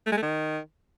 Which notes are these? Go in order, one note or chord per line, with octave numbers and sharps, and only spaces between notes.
A3
G#3
A3
D#3